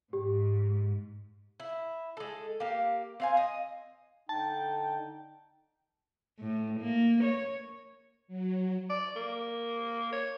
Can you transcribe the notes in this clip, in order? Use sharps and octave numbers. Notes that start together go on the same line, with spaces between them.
G#2 G4
E4
G#3 A4
A#3 G4
C4 F5 G#5
D#5
D3 D#4 G5 A5
A2
A#3
C#5
F#3
D5
A#3
C#5